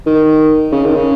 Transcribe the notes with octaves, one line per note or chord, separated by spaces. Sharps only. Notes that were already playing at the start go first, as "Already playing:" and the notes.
D#3
C#3
D#3
C#3